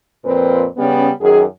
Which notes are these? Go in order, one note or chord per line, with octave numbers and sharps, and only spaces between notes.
F2 A#2 C4 B4
C#3 G3 B3 C#4
F#2 D#3 G#4